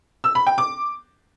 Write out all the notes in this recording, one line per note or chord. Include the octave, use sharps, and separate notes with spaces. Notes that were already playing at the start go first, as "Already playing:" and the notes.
E6
B5
G5
D6